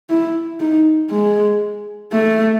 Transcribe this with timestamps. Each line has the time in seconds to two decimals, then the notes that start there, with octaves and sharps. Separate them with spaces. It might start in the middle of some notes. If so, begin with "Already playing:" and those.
0.10 E4
0.60 D#4
1.11 G#3
2.12 A3